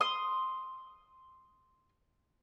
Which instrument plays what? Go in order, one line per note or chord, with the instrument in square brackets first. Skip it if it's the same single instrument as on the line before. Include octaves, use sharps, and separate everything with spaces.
[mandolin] C6 D#6